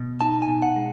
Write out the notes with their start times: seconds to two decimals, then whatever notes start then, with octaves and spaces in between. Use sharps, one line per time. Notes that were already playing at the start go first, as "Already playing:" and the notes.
Already playing: B2
0.21 D#4 A5
0.42 G#5
0.48 B2
0.62 F#5
0.76 G#3